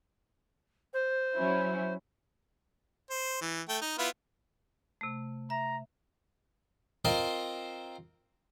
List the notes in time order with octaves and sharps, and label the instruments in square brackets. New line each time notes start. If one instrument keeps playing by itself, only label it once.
[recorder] C5
[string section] F#3 C#4 E4
[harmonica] C5
E3
A3 G5
D#4
B3 E4 F4
[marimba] C3 A3
[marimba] E5 [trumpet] A#5
[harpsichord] C4 F4 A#4 C5 D#5